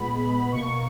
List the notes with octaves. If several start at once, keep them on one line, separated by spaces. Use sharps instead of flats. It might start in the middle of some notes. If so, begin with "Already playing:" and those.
Already playing: A#2 G#3 B3 B5
B2 A#3 C#6